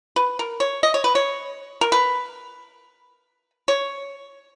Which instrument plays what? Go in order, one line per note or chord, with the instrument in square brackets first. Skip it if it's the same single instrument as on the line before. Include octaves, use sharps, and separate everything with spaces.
[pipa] B4
A#4
C#5
D#5
C#5
B4
C#5
A#4
B4
C#5